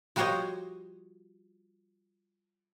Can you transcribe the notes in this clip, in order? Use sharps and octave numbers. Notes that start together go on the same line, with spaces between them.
F3 G3 F#4 C5 C#5 D#5